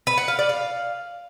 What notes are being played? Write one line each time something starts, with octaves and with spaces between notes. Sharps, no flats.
B4
F#5
F5
D5
F5